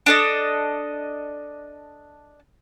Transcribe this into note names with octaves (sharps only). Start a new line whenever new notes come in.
D4 A4 D#5